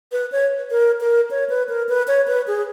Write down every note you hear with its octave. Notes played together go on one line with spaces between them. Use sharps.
B4
C#5
A#4
A#4
C#5
B4
A#4
B4
C#5
B4
G#4